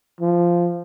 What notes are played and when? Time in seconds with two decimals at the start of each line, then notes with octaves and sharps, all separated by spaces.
0.21 F3